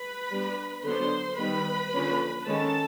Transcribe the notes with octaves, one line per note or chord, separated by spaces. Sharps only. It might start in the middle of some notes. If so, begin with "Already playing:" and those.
Already playing: B4 B5
G3 B3 D4
D3 F#3 B3 D4 C5 C6
D#3 G3 B3 B4 B5
D3 F3 A#3 C#4
D#3 G#3 C#4 A4 A5